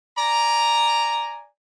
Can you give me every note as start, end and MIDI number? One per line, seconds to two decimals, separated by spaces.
0.17 1.46 74
0.17 1.46 80
0.17 1.46 82